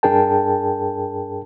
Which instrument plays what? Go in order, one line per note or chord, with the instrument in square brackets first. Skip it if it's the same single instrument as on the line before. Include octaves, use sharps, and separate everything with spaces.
[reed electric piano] G2 D4 G#4 A#4 G5 A5